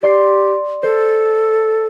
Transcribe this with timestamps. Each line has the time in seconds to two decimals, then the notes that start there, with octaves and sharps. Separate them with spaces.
0.03 G4 D5 C6 C7
0.83 A4 C5